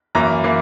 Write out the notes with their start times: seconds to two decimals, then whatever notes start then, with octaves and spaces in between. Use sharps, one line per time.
0.15 F#2 E3 A#3 A#5
0.44 E3 A#3